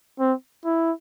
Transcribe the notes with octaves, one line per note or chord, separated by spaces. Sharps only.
C4
E4